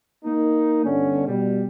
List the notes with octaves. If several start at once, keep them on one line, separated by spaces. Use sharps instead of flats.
A#3 D#4
G1 D3 C#4
B2 G3